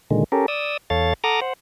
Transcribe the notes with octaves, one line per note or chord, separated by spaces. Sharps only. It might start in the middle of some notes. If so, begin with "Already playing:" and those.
A#2 D3 D#3 G#3
C#4 G4 A4 A#4
D5 D#6 E6
E2 A4 C#5 F5 A6
A4 F#5 A#5 D6 D#6 F6
C5 F#5